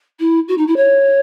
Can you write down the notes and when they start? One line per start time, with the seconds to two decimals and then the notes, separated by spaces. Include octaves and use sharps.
0.19 E4
0.48 F#4
0.58 D#4
0.67 E4
0.76 C#5